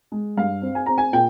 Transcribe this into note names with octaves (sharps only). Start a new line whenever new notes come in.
G#3
G2 F5
C4
G#5
C4 A#5
G#5
A#2 G5